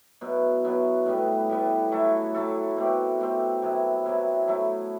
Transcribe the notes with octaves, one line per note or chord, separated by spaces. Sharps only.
B2 F#3 B3 E4
B2 F#3 B3 E4
A2 G3 B3
A2 G3 B3
F#3 A3 E4 A4
F#3 A3 E4 A4
B2 A3 C4 G4
B2 A3 C4 G4
C3 F#3 B3 E4
C3 F#3 B3 E4
F#3 A3 E4